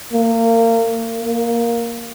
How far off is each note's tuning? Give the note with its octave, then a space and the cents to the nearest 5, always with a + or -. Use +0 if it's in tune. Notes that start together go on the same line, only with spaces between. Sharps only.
A#3 -30
A#3 +5